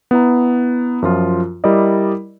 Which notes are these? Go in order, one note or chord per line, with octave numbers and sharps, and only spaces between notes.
B3 E4 A#5
F#2 F3 F4
G3 E4 A#4 D5 D#5